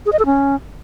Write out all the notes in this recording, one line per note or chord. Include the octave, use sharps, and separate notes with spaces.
G#4
D#5
A4
C#4